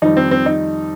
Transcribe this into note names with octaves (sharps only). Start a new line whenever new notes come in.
F2 D#3 G3 D#4
C4
C4
D#4